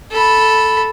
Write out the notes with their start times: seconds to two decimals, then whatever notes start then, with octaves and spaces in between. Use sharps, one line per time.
0.11 A4 B5